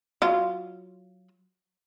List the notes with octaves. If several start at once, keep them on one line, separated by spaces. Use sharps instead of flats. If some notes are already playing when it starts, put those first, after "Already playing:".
F#3 F4